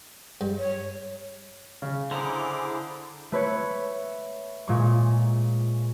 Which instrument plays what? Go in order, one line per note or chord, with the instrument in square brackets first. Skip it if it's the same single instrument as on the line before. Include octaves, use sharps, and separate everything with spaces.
[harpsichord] G2
[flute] C#5
[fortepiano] C#3
[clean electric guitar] D3 [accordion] E4 G#4 D6 [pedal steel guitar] C5 A#5 B5
[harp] A3 B4 C#5 C#7
A#2 G#3 C#6